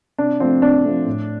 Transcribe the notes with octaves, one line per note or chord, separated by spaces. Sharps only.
C3 D4
F3 A3 C4
C3 D4
F3 A3
A2